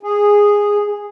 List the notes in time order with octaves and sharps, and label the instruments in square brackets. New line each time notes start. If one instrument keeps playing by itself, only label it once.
[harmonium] G#4